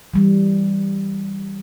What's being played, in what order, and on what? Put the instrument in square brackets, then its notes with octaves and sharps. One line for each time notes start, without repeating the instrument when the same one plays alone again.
[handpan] E3 G3